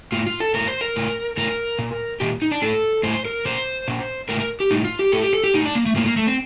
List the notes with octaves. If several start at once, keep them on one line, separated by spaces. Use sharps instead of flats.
A2 F4
F4
A4
A2 A#4
C5
A#4
A2
A2 A#4
A#2
A#2 G4
D#4
D4
A2 A4
A2 C5
A#4
A#2 C5
A#2
A2 A#4
A#4
G4
A2 D#4
F4
G4
A2 A4
G4
A4
G4
A2 D#4
D4
A#3
A3
A2 A#3
A#3
A3
C4